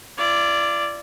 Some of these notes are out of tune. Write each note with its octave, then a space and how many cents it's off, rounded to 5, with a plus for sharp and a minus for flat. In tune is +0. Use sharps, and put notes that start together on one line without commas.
F4 -45 D5 +0